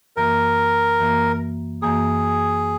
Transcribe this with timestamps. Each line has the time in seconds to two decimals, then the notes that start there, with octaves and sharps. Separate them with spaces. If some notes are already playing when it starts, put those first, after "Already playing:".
0.17 F#2 E3 A#3 A#4
1.00 F#2 E3 A#3
1.82 F#2 E3 A#3 G#4